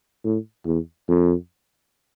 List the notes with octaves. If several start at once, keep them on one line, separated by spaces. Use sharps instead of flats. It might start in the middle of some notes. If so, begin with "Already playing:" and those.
A2
E2
F2